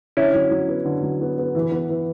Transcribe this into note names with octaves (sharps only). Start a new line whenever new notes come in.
D3 C#4 E4
F#3
F#3
B3
D3
F#3
B3
B3
E3
B3
E3